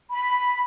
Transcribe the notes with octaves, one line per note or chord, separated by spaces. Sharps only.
B5